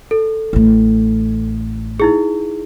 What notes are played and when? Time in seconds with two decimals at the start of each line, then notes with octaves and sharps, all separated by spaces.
0.11 A4
0.53 A1 A3
2.00 D#4 E4 G#4